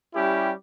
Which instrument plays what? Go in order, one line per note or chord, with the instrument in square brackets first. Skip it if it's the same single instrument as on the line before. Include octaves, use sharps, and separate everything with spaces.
[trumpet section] G3 C#4 E4 G4